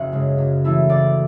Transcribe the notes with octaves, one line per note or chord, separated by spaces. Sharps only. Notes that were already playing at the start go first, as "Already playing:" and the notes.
Already playing: F#1 E5 F#5
F#2 C#3 G#3
F#2
E3 A3 E4
F#1 D5